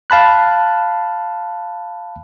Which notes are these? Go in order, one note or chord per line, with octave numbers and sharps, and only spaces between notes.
F5 A5 B5 F#6